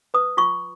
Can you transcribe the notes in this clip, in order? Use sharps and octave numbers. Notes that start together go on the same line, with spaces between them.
B4 D#6
F4 C#6